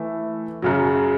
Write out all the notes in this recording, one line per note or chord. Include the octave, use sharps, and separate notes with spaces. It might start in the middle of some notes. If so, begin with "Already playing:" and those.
Already playing: E3 A3 E4
F#2 C#3 F#3